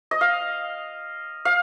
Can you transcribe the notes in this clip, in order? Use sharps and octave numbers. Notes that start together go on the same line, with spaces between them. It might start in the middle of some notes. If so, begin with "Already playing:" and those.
D#5
F5
F5